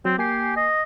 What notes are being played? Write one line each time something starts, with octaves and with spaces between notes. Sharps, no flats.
F#3 C4
A#3 G4 G#5 C7
D#5